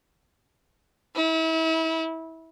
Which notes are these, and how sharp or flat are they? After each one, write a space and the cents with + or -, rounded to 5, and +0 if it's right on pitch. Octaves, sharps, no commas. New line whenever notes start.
E4 -35